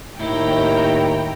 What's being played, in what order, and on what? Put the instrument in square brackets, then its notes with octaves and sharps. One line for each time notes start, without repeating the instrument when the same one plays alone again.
[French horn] D#2 [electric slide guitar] A2 [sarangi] E4 [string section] C#5 G5 A#5